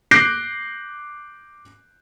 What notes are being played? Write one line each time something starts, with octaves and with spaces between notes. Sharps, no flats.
D6 F#6 G6 A#6 C7 D7